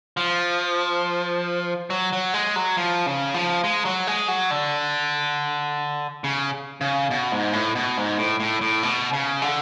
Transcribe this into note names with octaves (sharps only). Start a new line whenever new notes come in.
F3
F#3
F#3
G#3
F#3
F3
C#3
F3
G#3
F#3
G#3
F#3
D3
C#3
C#3
B2
G#2
A2
B2
G#2
A2
A2
A2
B2
C#3
D3